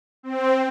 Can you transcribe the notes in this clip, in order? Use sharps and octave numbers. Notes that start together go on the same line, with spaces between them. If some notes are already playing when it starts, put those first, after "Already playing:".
C4